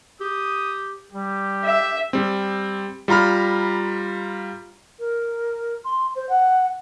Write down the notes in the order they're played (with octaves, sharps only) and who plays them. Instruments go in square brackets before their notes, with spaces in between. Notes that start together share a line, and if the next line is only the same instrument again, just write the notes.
[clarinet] G4 [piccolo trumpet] D#6
[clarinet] G3 [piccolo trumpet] G4
[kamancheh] E5
[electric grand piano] G3 C4
G3 F4 A#5 B5 F6
[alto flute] A#4
C6
C5
F#5